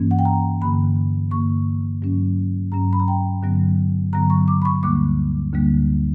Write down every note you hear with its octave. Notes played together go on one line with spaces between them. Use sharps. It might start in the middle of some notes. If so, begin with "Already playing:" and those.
Already playing: G2 E3 A#3 C#4
F#5
G5
A#5
G2 D3 A#3 B5
G2 D3 A#3 C#6
G2 F#3 C#4
G2 F#3 C#4 A#5
B5
A#5
G5
G2 D3 F#3 B3
G2 D3 F#3 B3 A#5
C#6
D6
B5
C#6
D2 D3 G3 A#3 D6
D2 D3 G3 A#3